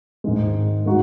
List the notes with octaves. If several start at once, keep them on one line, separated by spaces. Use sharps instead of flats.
G#2 D#3 G#3
G#3 D#4 F#4